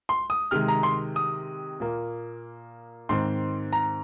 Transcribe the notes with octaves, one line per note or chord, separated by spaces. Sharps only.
C6
D#6
C3 D#3 G#3 F6
A#5
C6
D#6
A#2 A#3
G#2 D#3 C4 C6
A#5